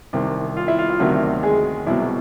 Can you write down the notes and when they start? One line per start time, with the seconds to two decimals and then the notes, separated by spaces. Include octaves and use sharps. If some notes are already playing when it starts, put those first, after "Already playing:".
0.13 C2 C3 D#3
0.57 F4
0.68 E4
0.78 F4
0.90 F4
1.00 D2 C3 D#3 F#3 F#4
1.43 G#3 G#4
1.86 C2 B2 F#3 E4